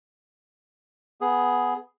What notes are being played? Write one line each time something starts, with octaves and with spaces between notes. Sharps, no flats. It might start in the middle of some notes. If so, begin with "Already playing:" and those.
B3 G#4